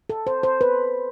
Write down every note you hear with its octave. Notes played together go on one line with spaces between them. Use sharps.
A4
C5
C5
B4